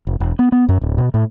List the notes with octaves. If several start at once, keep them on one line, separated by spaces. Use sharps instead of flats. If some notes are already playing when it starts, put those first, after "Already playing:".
F1
E1
B3
B3
F#2
D1
B2
A2